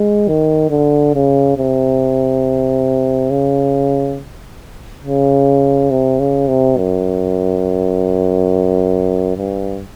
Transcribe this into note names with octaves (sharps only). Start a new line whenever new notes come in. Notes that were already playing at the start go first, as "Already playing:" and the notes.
Already playing: G#3
D#3
D3
C#3
C3
C#3
C#3
C3
C#3
C3
F#2
G2